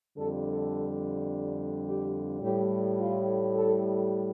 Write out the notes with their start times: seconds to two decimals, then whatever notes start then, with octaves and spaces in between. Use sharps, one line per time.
0.17 F2 D3 G3 A4
0.45 A4
1.86 G4
2.42 A2 G3 G4
2.99 F4
3.55 A4